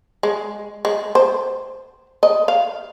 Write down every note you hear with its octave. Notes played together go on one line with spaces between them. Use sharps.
G#3
G#3
C5
D#5
F5